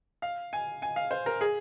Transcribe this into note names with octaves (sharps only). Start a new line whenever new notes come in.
F5
G#5
G#5
F5
C5
A#4
G#4